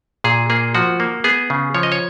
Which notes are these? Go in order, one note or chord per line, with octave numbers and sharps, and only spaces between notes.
A#2 G#4
A#3 G#4
F3 F#4
A#3
B3 G#4
C#3
F3 C#5
D#5
C#5